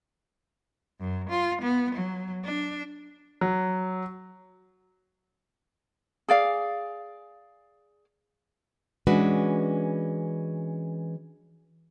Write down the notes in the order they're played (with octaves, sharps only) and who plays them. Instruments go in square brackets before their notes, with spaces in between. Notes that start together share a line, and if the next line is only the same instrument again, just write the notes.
[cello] F#2
F4
B3
F#3
D4
[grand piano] F#3
[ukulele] G#4 D5 F5
[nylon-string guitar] E3 G#3 C#4 D4 F#4 B4